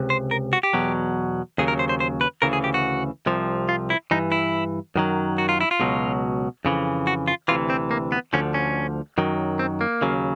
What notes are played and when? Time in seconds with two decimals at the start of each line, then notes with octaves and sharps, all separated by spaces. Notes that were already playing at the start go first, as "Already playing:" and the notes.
Already playing: C#2 C3
0.10 C5
0.31 A#4
0.53 F#4
0.63 G4
0.73 E2 B2 F#3
1.58 D#2 C#3 F#3 G#4
1.68 A#4
1.79 C5
1.89 C5
2.00 C5
2.21 B4
2.42 D2 C#3 E3 A#4
2.53 G#4
2.64 G4
2.74 F#4
3.26 C2 C3 F3
3.69 F4
3.90 E4
4.11 G2 E3 D#4
4.32 E4
4.96 F#2 D#3 F#3
5.38 F#4
5.49 F4
5.61 E4
5.71 F4
5.80 C#2 B2 F#3
6.65 F2 C#3 E3
7.07 F#4
7.28 F4
7.48 D2 C3 E3 F4
7.70 C4
7.91 A#3
8.12 B3
8.33 D2 D3 F3 C#4
8.54 C#4
9.18 F#2 D#3 F#3
9.59 C4
9.81 A#3
10.01 D#2 C#3 F#3